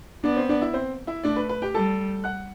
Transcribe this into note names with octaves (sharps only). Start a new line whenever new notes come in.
B3 D4 D5
C4 C5
D4 D5
E4 E5
C4 C5
E4 E5
A3 D4 D5
B4
B4
G4 G5
G3 A4 A5
F#5 F#6